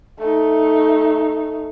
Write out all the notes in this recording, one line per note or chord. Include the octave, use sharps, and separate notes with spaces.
A3 D#4